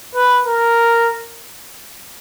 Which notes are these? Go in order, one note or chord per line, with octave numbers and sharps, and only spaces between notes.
B4
A#4